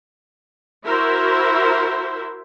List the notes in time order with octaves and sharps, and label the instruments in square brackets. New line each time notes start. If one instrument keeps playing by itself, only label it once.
[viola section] E4 F#4 A#4 C5 E5